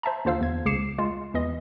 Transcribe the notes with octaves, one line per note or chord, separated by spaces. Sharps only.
C5 E5 A5 A#5
D#2 D3 F4 C5 F5 E6
E2 G#6
C#2 C#3 D6 C7 C#7 E7
G#3 F4
E2 E3 D#5